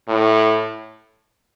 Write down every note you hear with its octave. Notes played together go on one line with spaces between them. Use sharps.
A2